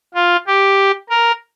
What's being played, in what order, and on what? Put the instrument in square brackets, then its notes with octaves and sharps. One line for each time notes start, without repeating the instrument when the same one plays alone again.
[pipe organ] F4
G4
A#4